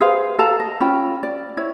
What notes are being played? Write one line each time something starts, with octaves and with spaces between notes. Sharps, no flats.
G#4 B4 C5 F5
A4 F5 A5 A#5
D#5
C#4 F4 G5 B5
D5
E4 C#5